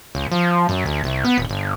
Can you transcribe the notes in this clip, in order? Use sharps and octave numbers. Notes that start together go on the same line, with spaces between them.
C#2
F3
F#2
D2
C2
B3
D#1
G1